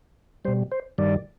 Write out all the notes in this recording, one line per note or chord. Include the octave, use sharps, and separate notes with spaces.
B2 G3 C5
C5
G2 D#3 G3 D5